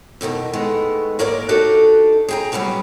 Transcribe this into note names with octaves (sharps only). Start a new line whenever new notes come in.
F2 B2 D3 D#3
D#3 G#3 A3 B3
G#2 A#3 A#4 C#5 D5
D4 D#4 F#4 G4 A4
G#4 G5 A#5
F#3 G3 B3 C#4 F#4